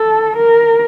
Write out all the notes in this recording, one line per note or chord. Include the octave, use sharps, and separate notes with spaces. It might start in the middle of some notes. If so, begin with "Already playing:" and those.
Already playing: A4
A#4